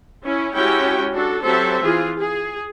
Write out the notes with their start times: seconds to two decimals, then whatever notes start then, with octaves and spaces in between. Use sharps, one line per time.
0.23 C#4 E4
0.55 G#3 C#4 E4 F#4 G4 G5
1.13 D4 F#4 A4
1.43 F#3 C4 G4 A4 C5 E5
1.83 E3 F4 G#4
2.21 G#4